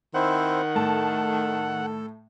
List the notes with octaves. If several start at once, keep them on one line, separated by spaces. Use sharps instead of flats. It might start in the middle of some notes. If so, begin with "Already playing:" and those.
D#3 C4 E4 C5 F#5
A2 A4 A5